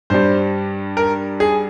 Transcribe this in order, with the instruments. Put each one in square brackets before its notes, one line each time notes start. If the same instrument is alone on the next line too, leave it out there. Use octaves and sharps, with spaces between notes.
[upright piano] G2 G3 C5
A#4
G#4